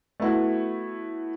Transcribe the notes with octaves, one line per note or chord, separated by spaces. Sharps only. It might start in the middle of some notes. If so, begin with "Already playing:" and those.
A3 B3 E4 F#4